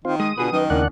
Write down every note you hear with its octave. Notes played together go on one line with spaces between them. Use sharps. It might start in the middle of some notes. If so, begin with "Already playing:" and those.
D#3 C4 F4
G#3 D#6
B2 D3 F4 G#4 B4
F#2 D#3 B4 D#5
D#2 A2 C#3 C#4 D4 A#4 F#5